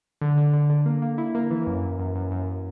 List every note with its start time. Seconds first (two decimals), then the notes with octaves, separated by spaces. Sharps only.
0.21 D3
0.37 D3
0.53 D3
0.70 D3
0.86 A#3
1.02 A#3
1.18 E4
1.35 A#3
1.51 E3
1.67 F#2
1.83 F#2
1.99 F#2
2.15 F#2
2.31 F#2